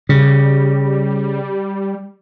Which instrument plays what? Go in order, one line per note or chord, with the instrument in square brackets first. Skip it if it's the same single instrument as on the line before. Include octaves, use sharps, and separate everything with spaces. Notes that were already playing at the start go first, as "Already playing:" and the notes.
[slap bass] C#3 [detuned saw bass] G3